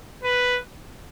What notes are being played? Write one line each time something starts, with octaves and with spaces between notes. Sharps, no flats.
B4